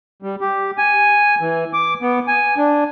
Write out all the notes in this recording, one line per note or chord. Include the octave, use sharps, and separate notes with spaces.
G3
G4
G#5
E3
D6
B3
G#5
D4